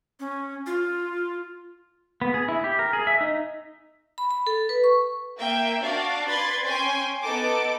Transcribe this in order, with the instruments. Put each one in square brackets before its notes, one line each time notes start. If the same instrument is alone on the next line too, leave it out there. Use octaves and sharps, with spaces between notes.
[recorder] C#4
F4
[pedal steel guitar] B3
G#4
E4
G4
A#4
G#4
E5
D#4
[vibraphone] B5
B5
A4
B4
C#6
[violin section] A#3 E5 G5
D4 F#4 D5 F5
B4 D5 B5 C6 G#6 A6
C#4 G5 G#5 C6
B3 D#4 A4 D6